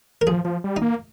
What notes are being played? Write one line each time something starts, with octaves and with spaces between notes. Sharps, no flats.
A#4
F3 G#4
F3
G3
D#4
A#3